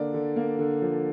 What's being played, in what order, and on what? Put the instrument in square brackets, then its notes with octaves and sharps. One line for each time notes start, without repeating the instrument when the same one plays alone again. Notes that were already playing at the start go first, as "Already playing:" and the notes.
Already playing: [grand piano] D3 A#3 D5
D3
A#3
D3
F3